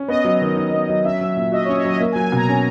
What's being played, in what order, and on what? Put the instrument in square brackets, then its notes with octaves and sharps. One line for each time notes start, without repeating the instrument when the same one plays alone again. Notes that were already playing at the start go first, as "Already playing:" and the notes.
Already playing: [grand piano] C#4
[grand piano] B3 [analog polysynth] D#5
[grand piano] F#3
D#3
D#4
B3
F#3
[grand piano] C#4 [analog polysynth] E5
[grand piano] F#3
A#2
[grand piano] F#4 [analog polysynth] D#5
[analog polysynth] C#5
[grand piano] C#4
[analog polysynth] C#5
[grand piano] F#3 [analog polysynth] D#5
[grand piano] A#3 [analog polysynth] E5
[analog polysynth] G#5
[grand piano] F#3
[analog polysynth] G#5
[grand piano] B2 [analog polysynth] A#5
[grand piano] C#4